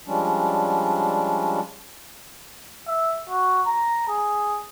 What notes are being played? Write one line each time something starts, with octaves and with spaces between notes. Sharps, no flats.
F3 G3 G#3 C#4 D4
E5
F#4
A#5
G#4